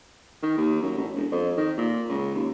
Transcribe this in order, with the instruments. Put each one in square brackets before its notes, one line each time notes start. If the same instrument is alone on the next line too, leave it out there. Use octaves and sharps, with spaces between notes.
[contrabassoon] D#3
D#2
F#2
A1
E1
F2
D#3
A#2
C#2
D#2